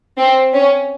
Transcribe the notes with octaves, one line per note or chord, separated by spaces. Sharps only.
C4
C#4